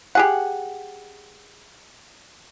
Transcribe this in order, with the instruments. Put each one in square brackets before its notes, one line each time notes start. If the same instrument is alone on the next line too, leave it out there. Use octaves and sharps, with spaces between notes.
[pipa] G4 G#4 F#5